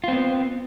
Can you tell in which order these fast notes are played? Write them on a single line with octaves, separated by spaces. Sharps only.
F4 C4 B3